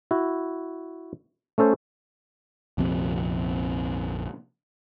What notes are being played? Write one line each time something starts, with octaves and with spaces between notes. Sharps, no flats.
E4 F#4
A3 C#4 A4 C5
A#1 F2 C3